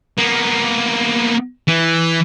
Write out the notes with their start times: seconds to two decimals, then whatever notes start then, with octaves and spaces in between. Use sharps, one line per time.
0.19 A#3 B3
1.68 E3